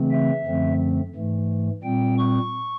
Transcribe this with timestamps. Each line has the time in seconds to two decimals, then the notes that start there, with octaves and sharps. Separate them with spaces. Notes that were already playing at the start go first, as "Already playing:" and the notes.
Already playing: C#3 E3 A3 C4
0.11 E5
0.45 F#2 D3 F3 A3 C4
1.15 G#2 E3 A3
1.83 A#2 G3 C4 G5
2.18 C#6